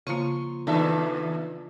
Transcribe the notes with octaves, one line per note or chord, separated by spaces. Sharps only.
C#3 F3 A#3 C6 C#6
D#2 E3 D4 D#4 A4 E5 A5